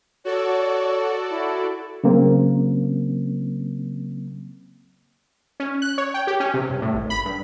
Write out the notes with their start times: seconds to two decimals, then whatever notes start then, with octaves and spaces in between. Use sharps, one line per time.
0.25 F#4 A4 C#5 D5
1.30 E4
2.04 C#3 F#3 A#3 C4
5.60 C#4
5.82 F#6
5.98 C#5
6.14 G5
6.27 G4
6.40 C#4
6.54 C3
6.69 G2
6.82 A2
6.94 G#1
7.10 B5
7.25 G2